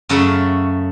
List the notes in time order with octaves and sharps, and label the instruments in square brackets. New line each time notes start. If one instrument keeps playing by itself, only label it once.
[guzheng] F#2 C#3 A3 C#5 E5 F#5